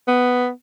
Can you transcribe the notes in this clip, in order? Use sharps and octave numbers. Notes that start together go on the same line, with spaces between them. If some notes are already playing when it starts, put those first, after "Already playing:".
B3